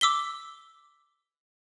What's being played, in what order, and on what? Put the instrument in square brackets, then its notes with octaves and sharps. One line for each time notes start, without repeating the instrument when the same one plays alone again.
[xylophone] D6 E6 B6 G7